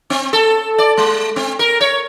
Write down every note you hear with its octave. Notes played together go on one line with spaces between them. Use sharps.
C4
A4
D5
G#3
C4
A#4
C#5